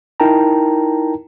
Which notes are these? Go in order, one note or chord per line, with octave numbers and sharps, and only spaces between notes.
D#4 E4 A#4 G5 A5 A#5